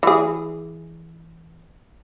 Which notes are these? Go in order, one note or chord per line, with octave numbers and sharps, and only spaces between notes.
E3 G#4